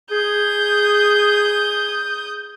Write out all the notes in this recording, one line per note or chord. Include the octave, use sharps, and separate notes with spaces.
G#4 D#6 G6